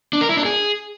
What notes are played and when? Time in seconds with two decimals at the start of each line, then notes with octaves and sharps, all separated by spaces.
0.13 D4
0.21 A#4
0.29 E4
0.37 D4
0.45 G#4